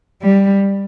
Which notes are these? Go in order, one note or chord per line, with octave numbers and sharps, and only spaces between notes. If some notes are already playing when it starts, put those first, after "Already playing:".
G3